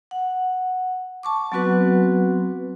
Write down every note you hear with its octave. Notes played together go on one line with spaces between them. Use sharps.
F#5
A5 C#6 D6
F#3 B3 C4 F#4 B4 F#5